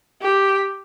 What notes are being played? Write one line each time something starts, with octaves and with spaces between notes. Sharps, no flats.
G4